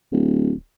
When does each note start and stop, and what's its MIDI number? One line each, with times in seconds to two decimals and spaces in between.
0.12 0.52 26